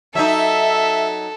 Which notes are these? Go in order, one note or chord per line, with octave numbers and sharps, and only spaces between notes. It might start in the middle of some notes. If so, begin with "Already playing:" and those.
F#3 D#4 A4 E5